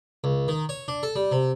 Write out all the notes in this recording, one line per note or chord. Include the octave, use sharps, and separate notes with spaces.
C#2
D#3
C#5
D4
A4
G3
C3